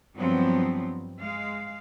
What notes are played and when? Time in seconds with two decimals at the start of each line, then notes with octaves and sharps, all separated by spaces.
0.16 G2 F3 F#3 B3 C4
1.20 G#3 F5